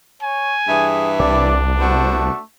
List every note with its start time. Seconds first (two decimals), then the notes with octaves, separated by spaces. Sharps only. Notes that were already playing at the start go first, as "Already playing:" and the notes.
0.22 C#5 G#5
0.68 G2 E3 G#4 E5
1.20 C2 D4 D5
1.78 A3 B3 F#4 C5